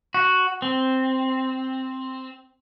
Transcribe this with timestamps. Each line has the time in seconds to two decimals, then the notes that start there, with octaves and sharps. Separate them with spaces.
0.14 F#4
0.62 C4